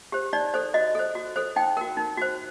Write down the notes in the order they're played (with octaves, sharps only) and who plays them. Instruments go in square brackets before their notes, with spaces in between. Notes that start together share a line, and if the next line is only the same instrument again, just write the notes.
[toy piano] G4 C5
D#4 D5
A4 C5
F#4 D#5
A4 C5
F#4
A4 C5
D#4 G5
F#4 A#4
D#4
F#4 C5